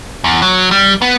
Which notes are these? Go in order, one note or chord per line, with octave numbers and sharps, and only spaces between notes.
E2
F#3
G3
B3